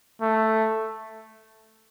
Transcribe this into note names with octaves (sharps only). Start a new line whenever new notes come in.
A3